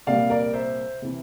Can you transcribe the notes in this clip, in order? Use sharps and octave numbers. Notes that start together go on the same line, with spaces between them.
C2 A#2 G3 A#3 D5 F5
A#4 D5
C5 E5
C3 E3